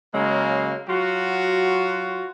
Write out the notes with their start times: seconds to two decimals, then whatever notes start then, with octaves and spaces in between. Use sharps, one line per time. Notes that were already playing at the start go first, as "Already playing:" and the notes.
0.13 C#3 F#3 G#3 A#3
0.88 F#3 F4 F#4